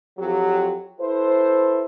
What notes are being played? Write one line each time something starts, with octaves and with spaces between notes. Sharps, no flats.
F2 F#3 G4
E4 A4 B4 C5